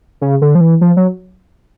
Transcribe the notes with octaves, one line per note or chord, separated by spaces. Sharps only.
C#3
D3
F3
E3
F3
F#3